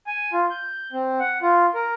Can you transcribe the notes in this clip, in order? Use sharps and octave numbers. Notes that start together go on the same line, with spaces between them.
G#5
F4
G6
C4
F#5
F4
A#4